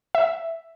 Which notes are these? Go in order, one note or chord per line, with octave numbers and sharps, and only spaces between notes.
E5